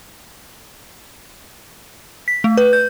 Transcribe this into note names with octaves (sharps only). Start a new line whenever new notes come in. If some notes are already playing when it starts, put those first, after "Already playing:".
B6
A3
B4
G6